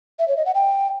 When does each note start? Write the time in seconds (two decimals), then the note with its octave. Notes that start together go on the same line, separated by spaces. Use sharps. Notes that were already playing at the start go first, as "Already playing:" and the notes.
0.19 E5
0.28 C#5
0.37 D#5
0.46 F#5
0.55 G5